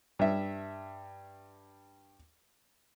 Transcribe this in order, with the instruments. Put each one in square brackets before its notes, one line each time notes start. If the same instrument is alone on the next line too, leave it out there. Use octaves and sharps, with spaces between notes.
[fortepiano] G2 E5